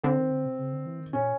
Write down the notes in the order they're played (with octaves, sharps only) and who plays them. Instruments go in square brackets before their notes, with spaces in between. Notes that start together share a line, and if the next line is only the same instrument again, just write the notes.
[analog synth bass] D3 [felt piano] C4
[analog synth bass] D#3
D3
C3
C#3
D3
E3
D#3
[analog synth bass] A#2 [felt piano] C#4